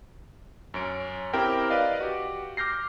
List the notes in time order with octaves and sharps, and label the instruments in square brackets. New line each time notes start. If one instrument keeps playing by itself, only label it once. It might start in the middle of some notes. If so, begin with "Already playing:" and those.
[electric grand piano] F#2 C#4 D7
C4 E4 G4 A#4 G5
B4 D5 D#5 F5
F#4 G4
D6 F6 G6 A#6 C7